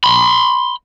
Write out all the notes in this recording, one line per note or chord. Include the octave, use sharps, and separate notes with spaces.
B5 C6